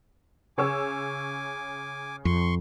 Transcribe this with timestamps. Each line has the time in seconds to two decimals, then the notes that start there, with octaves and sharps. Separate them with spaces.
0.58 C#3 C#5 G#5 D6 E6
2.25 F2 C6 C#6